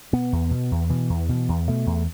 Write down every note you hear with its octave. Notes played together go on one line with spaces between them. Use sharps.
B2 B3
E2
B2
E2
B2 E3
E2
B2
E2
B2 A3
E2